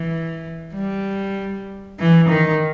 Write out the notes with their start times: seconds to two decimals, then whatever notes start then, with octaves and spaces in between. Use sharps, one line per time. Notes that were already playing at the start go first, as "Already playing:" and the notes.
Already playing: E3
0.75 G3
1.99 E3
2.29 D#3